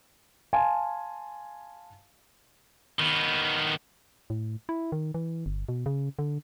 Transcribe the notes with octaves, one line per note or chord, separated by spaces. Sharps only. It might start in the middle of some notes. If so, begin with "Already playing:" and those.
F5 G#5 A5 C6
D#3 B3
A2
E4
D#3
E3
G1
B2
C#3
D3